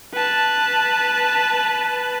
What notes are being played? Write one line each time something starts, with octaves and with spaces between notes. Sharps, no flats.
B4 A5